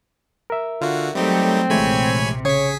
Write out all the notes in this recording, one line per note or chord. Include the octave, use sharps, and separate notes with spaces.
A#4 E5
D3 F4 F#4
F#3 G3 A3 C4 D#4 G4
A#1 C3 E3 G#3 A3 C#5 G#5 B5
C#3 G#4 C#5 G#5 B6